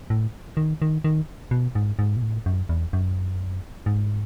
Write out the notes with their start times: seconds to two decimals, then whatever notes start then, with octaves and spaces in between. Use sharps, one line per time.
0.10 A2
0.57 D#3
0.82 D#3
1.04 D#3
1.51 B2
1.75 G#2
1.99 G#2
2.17 B2
2.22 A2
2.46 F#2
2.69 E2
2.93 F#2
3.86 G#2